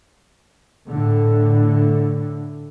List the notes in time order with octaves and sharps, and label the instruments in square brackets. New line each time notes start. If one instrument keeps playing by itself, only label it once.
[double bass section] A2 D3